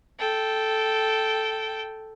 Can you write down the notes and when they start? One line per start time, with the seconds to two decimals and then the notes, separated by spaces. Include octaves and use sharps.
0.20 A4 G5